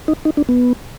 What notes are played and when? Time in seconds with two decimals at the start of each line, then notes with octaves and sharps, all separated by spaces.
0.08 D#4
0.25 D#4
0.37 D4
0.49 B3